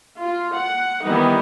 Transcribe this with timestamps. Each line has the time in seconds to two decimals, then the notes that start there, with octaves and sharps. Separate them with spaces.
0.21 F4
0.57 F#5
1.05 D#3 E3 G3 B3 D#4